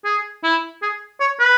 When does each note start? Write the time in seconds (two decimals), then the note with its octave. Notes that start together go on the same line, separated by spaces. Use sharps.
0.05 G#4
0.43 E4
0.82 G#4
1.20 C#5
1.40 B4